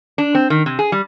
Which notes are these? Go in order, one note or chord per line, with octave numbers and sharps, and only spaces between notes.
D4
C4
D#3
C3
G#4
G3